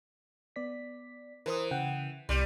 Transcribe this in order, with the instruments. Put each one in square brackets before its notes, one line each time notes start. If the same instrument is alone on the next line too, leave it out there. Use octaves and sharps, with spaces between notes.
[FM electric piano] B3 D5 B6
[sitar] E3 [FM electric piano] A#4 C5 D#6
[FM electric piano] C#3 F#5 G5
[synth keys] C2 D#7 [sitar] G3 [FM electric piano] C6 D6 G6